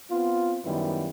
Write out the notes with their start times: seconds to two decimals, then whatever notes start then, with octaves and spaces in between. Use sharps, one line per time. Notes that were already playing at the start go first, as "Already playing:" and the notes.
0.11 B3 C4 F4
0.64 F#2 D#3 G3 B3 E4